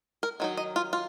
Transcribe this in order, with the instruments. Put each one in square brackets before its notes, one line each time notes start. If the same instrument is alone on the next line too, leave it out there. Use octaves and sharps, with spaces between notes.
[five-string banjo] A#4
D#3 F#3 D#4
D#5
F4
F4